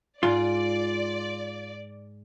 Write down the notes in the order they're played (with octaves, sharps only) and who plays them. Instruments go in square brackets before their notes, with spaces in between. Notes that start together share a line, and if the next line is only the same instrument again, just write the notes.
[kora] G#2 [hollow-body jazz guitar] F4 [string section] D5